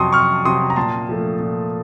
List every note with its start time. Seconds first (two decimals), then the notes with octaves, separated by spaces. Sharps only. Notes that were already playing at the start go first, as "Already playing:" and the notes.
Already playing: F2 C3 F#3 A5 C6 C#6 D#6
0.13 F2 C#6 F6
0.45 C3 F#3 C6 D#6
0.70 A#5
0.76 A#2 A5 C6
1.09 F3 A3
1.40 A#2